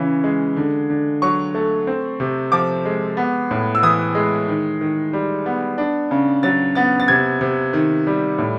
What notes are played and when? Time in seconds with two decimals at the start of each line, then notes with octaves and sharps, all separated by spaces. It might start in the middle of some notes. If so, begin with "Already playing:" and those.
Already playing: C#3 E3 C#4
0.24 G#3
0.56 D3
0.90 D3
1.22 F#3 C#6
1.54 A3
1.87 C4
2.20 C3
2.52 F3 D6
2.85 G#3
3.17 B3
3.51 A2
3.75 E6
3.83 E3 D#6
4.15 G#3
4.48 D#3
4.81 D#3
5.13 G3
5.46 B3
5.78 D4
6.11 C#3
6.43 F#3 A6
6.75 B3 A6
7.00 A6
7.08 C3 G#6
7.41 C3
7.73 D#3
8.07 G3
8.38 A2